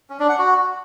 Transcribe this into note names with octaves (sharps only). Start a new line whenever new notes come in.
C#4
D4
F#5
F#4